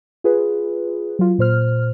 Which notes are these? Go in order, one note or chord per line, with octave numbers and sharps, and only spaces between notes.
F4 G#4 B4
F#3 F4
A#2 C5 F6